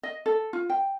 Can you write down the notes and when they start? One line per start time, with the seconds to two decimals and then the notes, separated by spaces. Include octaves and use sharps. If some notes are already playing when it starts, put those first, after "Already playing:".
0.03 D#5
0.26 A4
0.53 F4
0.70 G5